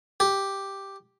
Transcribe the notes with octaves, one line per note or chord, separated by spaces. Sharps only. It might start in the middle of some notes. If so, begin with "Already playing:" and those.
G4